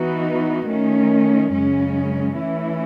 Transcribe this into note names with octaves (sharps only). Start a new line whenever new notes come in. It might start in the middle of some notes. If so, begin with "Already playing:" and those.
Already playing: E3 B3 D#4 F#4
D#3 A3 C#4
F#2 C#3 G#3 C#4
E3 A3 C#4 E4